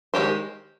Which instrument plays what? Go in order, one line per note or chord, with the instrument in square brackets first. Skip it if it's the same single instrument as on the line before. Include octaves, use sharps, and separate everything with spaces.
[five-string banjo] D#3 G#3 C4 G4 C5